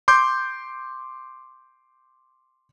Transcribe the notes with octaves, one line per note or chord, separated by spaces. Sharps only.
C6 D6 G6